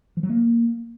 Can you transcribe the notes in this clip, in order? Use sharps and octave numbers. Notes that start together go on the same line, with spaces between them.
F3
F#3
A#3